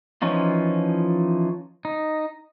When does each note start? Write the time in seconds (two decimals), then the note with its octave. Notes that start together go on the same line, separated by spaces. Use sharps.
0.22 E3 F3 C#4 D#4 F4
1.85 D#4